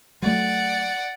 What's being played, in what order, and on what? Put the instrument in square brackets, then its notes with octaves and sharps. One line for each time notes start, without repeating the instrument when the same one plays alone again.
[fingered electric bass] F#3 A3 [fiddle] D5 F#5